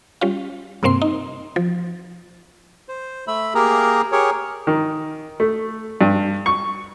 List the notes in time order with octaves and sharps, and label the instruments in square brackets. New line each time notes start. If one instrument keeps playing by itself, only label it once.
[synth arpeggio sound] G3 C#4 F4
G2 C3 A#3 C4 C6
D#4
F3
[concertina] C5
A3 E5 B5 E6
A#3 G4 G#4 A#4 A#5
G4 G#4 A#4 C#5
[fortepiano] D#3
A3
G2
C#6